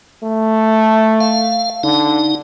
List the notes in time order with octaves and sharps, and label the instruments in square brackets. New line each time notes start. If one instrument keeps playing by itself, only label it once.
[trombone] A3
[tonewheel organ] F5
[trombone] D3 [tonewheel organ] D#4